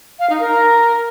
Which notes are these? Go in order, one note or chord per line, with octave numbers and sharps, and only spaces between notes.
F5
D#4
A#4